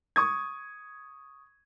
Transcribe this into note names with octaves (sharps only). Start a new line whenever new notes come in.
C#6 D#6 G#6